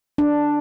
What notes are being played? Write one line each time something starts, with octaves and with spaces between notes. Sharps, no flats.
D4